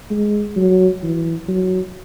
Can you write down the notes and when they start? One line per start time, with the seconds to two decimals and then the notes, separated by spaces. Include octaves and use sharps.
0.10 G#3
0.56 F#3
1.03 E3
1.48 F#3